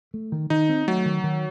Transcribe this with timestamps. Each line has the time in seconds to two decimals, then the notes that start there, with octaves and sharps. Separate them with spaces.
0.14 A3
0.32 D#3
0.50 D#3 D#4
0.69 C4
0.88 F#3 A3
1.06 D#3
1.24 D#3